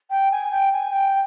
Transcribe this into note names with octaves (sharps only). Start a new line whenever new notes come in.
G5
G#5
G5
G#5
G5